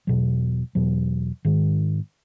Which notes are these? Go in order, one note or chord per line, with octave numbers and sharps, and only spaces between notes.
E2 B2 F#3
E2 B2 F#3
G#2 D#3 G#3